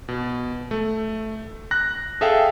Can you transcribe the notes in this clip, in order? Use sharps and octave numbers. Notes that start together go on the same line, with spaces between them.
B2
A3
F#6 A#6
G#4 A4 E5 F5 G5